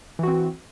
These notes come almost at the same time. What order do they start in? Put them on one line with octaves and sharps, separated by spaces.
E3 F#4 C4